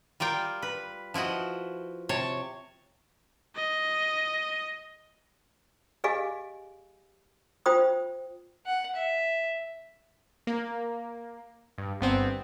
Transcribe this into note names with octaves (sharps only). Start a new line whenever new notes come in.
G3 F4 A#4 G5
B4
F3 E4 F#4 D#5
C3 C#5 A5
D#5
G4 G#4 D#5 F5 G#5
F4 C5 G5 B5 D#6
F#5
E5
A#3
G2
G1 B3 C4